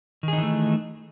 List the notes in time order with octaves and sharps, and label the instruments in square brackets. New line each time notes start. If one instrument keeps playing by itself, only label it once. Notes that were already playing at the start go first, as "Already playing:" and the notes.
[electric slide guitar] D#3
G#4
D#4
E3
A3